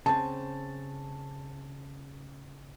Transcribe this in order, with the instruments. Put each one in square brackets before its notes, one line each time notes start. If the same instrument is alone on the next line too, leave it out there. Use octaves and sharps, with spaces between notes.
[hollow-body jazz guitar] C#3 C4 [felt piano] A5